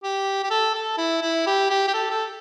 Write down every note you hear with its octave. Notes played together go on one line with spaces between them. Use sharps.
G4
G4
A4
A4
E4
E4
G4
G4
G4
A4
A4